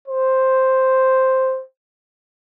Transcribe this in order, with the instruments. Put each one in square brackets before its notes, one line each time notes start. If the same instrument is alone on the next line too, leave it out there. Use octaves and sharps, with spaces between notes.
[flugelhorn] C5